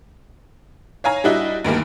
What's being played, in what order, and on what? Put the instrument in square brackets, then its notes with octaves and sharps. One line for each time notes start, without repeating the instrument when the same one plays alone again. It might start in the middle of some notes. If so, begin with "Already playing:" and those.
[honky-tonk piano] C#5 F5 G#5 A#5
G3 D4 E4 F#4 D#5
D2 G2 D#3 A#3